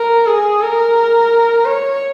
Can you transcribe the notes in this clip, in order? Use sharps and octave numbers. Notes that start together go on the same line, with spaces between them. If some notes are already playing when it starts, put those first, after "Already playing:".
Already playing: A#4
G#4
A#4
C#5